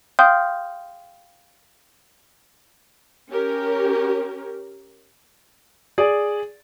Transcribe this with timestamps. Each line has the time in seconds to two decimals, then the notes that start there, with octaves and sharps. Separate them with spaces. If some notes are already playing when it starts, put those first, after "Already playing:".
0.19 F5 G5 C6 D#6 F6 G6
3.31 C#4 G4 A#4
5.98 G#4 D5